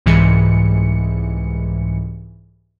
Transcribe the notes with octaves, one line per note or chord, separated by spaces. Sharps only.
C2 G#2 E3 C#7